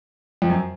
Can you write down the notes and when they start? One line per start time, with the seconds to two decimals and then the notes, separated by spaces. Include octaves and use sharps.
0.42 F2
0.50 F#2